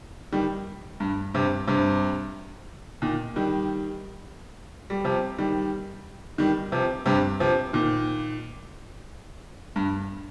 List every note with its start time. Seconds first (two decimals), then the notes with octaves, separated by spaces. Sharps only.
0.33 D#3 G3
1.00 G2
1.34 G2 C3
1.68 G2 C3
3.02 A#2 D#3
3.36 D#3 G3
4.90 G3
5.04 C3 F3
5.38 D#3 G3
6.38 D#3 G3
6.72 C3 F3
7.06 G2 C3
7.40 C3 F3
7.73 A#2 D#3
9.76 G2